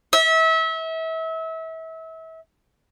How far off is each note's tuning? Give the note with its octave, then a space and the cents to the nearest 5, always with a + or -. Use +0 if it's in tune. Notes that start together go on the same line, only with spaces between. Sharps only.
E5 -30